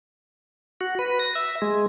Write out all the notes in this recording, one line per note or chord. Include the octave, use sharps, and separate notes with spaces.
F#4
B4
A#6
E5
G#3